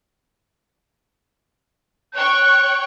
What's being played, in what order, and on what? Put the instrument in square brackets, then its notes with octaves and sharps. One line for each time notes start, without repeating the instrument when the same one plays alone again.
[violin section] C#5 G5 C#6 [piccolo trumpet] F#6